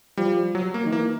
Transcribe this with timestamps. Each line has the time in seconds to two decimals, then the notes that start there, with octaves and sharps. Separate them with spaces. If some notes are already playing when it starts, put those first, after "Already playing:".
0.17 F3 G3
0.55 F#3
0.74 A#3
0.85 D#3
0.92 E3 A#3